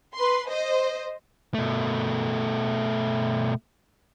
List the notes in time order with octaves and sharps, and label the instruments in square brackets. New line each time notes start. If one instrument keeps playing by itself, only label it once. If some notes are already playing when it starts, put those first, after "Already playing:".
[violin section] B4 C6
C5 D#5
[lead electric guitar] B2 A3